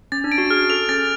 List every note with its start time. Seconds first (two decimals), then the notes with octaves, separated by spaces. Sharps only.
0.12 C#4 A6
0.24 D4
0.32 D7
0.38 F#4
0.50 G#4 F6
0.70 A4 F7
0.89 C#4 A6